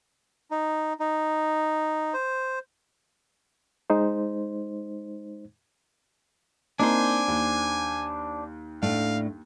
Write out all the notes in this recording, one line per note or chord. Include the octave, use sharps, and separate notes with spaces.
D#4
D#4
C5
G#3 D#4 C5
A#3 C4 D4 D#4 C5 G#5
D#2
A2 A3 D4 F5